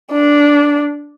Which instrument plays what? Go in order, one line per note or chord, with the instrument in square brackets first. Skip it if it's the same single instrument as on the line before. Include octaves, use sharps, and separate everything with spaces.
[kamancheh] D4